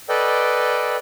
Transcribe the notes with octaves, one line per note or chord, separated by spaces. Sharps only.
A4 B4 D5 D#5 G5